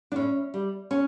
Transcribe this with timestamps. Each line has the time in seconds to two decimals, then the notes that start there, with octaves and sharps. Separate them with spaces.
0.12 D4
0.16 A2 C#4
0.54 G3
0.91 C#4